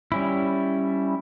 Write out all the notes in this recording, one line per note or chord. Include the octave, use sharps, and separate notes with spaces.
G3 C#4 E4